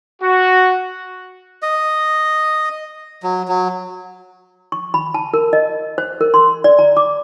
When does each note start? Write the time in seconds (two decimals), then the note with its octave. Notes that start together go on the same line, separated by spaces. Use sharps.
0.22 F#4
1.62 D#5
3.23 F#3
3.48 F#3
4.72 C#6
4.94 B5
5.14 A5
5.34 A#4
5.53 D#5
5.98 C5
6.21 A#4
6.34 C6
6.64 D5
6.79 A#5
6.97 D6